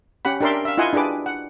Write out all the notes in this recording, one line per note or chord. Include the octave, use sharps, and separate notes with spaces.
C#4 G4 F#5 B5
D4 G4 A#4 D5 E5 C6
E5 F5
E4 F4 D#5 F#5 G#5 C6
D4 G4 G#4 B4 D6
F#5